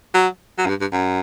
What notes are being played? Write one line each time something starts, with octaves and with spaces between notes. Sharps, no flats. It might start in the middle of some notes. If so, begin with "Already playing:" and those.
F#3
F#3
F#2
G2
G2
F#2